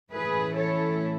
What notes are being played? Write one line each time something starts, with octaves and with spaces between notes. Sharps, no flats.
A2 E3 A3 C#4 E4 G#4 B4
A4 C#5